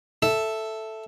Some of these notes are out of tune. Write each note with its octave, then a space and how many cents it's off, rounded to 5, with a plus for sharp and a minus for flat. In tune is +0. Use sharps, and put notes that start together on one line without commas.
A4 +0 E5 +0